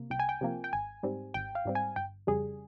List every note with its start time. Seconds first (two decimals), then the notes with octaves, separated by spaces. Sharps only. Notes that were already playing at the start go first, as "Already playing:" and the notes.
Already playing: C3 A#3
0.10 C2 G5
0.19 G#5
0.29 G5
0.41 C3 F3 A#3
0.64 G5
0.73 G#1 G#5
1.03 G#2 G3 C4
1.34 G#1 G5
1.55 F5
1.65 G#2 G3 C4
1.75 G#5
1.96 G1 G5
2.27 F2 C#3 G3 G#4